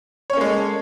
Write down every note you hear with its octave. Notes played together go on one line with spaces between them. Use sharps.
G#3 A#3 C#4 A4 C#5